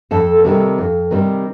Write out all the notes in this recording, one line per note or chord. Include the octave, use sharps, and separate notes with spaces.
F2 A4 A5
C3 D#3 G3 C4
F2
C3 D#3 G3 C4